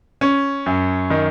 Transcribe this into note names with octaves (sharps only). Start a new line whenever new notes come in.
C#4
F#2
D#3